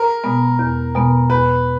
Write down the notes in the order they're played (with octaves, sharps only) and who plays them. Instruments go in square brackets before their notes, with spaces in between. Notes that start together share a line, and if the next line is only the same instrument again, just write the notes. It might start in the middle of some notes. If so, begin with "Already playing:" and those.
Already playing: [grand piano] A#4
[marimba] B2 G#3 B3
E2
B2 G#3 B3
[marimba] E2 [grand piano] B4